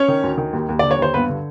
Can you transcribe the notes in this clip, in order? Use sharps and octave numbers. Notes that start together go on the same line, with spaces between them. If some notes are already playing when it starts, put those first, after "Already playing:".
Already playing: C#4 C#5
D#3
D2
D#3
D#2
D#2
D3 D5
C#5
D#2 C5
G2 B3 B4
D3